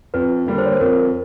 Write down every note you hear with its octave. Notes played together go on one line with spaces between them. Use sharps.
F2 B4
D3 G3 A#3
C5
C#5
C5
F2 A#4